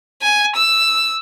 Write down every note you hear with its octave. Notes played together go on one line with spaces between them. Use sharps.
G#5
E6